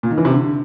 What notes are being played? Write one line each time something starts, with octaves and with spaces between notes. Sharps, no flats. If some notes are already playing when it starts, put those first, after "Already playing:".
A#2
D#3
E3
C3
D3